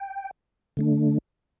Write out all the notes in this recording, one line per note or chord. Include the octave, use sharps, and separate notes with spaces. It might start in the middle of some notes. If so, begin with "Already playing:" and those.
Already playing: G5
D3 A3 D4